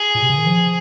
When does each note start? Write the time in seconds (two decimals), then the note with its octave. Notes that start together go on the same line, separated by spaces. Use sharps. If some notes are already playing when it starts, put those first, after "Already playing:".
Already playing: G#4
0.15 A#2
0.22 C3
0.30 C#3
0.38 D#3
0.46 F3